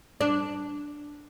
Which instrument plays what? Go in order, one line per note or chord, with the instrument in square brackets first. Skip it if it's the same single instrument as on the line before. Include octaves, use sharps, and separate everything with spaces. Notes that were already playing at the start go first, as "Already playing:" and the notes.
[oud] D4